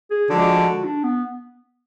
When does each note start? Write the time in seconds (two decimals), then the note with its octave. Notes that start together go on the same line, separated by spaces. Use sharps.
0.11 G#4
0.29 D3 F3 G#3 D4 F#4
0.84 D4
1.04 B3